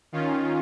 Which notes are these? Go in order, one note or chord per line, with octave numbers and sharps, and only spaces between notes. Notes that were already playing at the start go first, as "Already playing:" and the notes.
D#3 C#4 F4